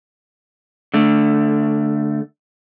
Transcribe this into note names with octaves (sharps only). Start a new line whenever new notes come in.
D3 A3